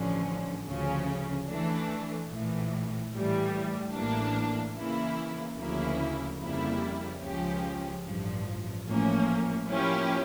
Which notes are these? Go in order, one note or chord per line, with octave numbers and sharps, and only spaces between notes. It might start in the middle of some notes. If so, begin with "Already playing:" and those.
Already playing: A1 G2 D3 F3 C#4
D2 C#3 F3 C#4
E3 A3 D4
A#1 A2 E3
A2 E3 G3
A1 A2 E3 A#3 D4
C#3 E3 A#3 E4
D2 C#3 F3 A#3 E4
F2 C#3 G3 A#3 E4
C#2 C#3 F3 C#4 G4
A1 G2 F3
A1 A2 F3 A#3 C#4
F3 A#3 C#4 E4 G4